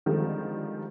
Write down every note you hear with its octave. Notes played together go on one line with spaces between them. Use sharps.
D3 D#3 F3 G3 G#3 C4